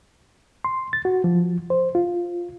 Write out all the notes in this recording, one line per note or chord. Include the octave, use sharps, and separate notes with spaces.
C6
A6
F#4
F3
C5
F4